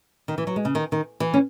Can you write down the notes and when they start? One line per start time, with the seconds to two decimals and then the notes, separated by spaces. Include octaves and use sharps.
0.28 D#3
0.38 E3
0.47 F#3
0.56 G#3
0.65 C#3
0.75 D#3
0.92 D#3
1.20 E3
1.34 C#4